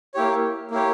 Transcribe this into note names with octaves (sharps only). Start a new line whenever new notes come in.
A#3 E4 G4 C#5
A#3 E4 G4 C#5